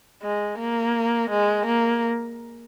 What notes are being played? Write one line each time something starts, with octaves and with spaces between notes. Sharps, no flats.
G#3
A#3
G#3
A#3